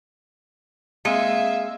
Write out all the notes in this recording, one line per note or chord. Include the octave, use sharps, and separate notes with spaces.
G#3 A#3 C4 E5 F5